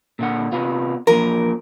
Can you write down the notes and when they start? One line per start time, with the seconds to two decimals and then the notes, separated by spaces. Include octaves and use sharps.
0.19 A#2 D3 F#5
0.52 C3 B3 F4
1.07 E2 F3 A#3 A#4